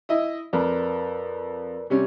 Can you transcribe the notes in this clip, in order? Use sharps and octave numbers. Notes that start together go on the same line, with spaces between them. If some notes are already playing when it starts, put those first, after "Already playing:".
E4 D#5 E5
F2 A#4 B4 D5
C3 G3 C#4